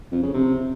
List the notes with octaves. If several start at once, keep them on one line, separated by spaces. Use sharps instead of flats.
F2
C#3
C3